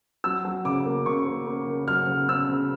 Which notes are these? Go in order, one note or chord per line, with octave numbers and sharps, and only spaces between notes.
F#3 E6
F#3
C#3 D6
A#3
C#3 C#6
A#3
A#3
C#3
F#3 F6
C#3
C#3 E6
C#3